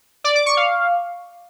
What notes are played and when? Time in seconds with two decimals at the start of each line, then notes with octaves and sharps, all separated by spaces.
0.24 D5
0.35 D6
0.46 C#6
0.57 F5